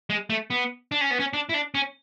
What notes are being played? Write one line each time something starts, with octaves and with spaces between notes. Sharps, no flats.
G#3
A3
B3
D4
C#4
B3
C#4
D4
E4
D4
C#4